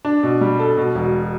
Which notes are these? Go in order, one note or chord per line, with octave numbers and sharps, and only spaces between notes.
D4
B2
G3
A4
B2
E1